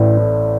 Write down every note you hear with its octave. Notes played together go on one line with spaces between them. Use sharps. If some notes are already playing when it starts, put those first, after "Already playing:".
Already playing: A1 A2 D5
A2